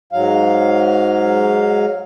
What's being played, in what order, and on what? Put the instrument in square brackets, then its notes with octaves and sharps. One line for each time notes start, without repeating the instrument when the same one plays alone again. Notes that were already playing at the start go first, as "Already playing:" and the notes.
[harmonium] G#2 F#3 F5